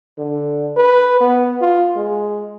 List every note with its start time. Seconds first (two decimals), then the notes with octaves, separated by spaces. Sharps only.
0.18 D3
0.76 B4
1.21 B3
1.61 F4
1.96 G#3